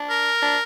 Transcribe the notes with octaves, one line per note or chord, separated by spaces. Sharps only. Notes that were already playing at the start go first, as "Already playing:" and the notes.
Already playing: D4
A#4
D4